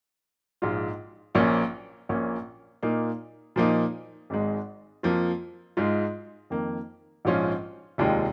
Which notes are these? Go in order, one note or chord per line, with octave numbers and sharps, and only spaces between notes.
A#1 G#2 G#3 F4
A#1 A#2 F3 A#3 C#4
A#1 A#2 A#3 C#4
A#2 A#3 D#4
A#2 F3 A#3 D#4
G#1 G#2 G#3
F2 F3 A#3 F4
G#2 G#3 F4
F2 D#3 A#3
A#1 G#2 F3 C#4 F4
F1 D#2 D#3 G#3 F4